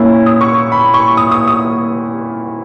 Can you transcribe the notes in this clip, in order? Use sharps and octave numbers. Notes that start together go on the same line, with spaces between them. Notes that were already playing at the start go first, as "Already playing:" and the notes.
Already playing: A#2 A#3 C#4 E4
D#6
C#6
B5
C#6
D#6
D#6
D#6